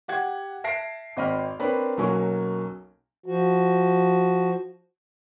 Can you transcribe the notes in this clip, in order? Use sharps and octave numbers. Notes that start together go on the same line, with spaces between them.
G4 F#5 G#6
E5 A5 A#6 C7 D7
G#1 C4 D#5 B5 F6
C4 D4 A#4 B4 C#5 B5
B1 F#3 A#3 C#4 G#5 C#6
F3 F#4